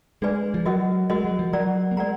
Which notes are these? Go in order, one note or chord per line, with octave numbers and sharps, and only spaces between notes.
G#3 D4 G#4 B4 D5 G#5
F3
F#3 F#4 A#4 D#5 F#5
G#3 F#4 A#4 D#5 F#5
F#3
F3
F#3 A#4 D5 F#5 A#5
A#3
G#3 A#4 D5 F#5 A#5